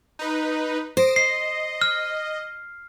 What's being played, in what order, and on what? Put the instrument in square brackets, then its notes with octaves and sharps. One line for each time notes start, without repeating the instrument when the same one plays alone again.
[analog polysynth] D#4 B4
[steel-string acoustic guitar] C5 [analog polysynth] D#6 A#6 D7
[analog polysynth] D#5 [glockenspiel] C7
[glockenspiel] F6